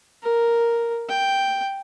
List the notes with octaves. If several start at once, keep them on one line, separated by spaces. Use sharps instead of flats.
A#4
G5